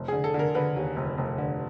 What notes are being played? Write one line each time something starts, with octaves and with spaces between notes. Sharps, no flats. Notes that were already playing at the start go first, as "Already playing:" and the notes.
Already playing: F1
G#4
D3
A4
D3
A#4
D3 B4
D#2
F1
F1
D3